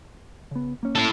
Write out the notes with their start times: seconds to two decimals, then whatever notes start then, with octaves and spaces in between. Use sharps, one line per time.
0.51 C#3 B3
0.83 A#3 C#4
0.95 E4 A4